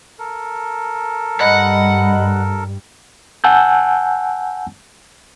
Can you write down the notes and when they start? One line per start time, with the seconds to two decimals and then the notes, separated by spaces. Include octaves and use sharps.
0.19 A4 A#4
1.41 G2 G3 D#5 F#5 B5
3.44 F#5 G#5 A5 E6 F#6 G6